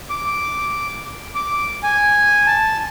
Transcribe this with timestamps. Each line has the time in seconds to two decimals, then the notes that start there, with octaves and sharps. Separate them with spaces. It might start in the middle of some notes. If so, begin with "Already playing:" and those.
0.10 D6
1.35 D6
1.83 G#5
2.47 A5